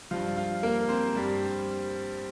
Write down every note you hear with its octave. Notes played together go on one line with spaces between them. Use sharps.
G2 F3 F4
F4
A#3 A#4
C4 C5
G2 G3